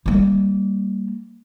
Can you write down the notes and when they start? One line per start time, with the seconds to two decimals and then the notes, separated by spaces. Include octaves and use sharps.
0.06 G3 A#3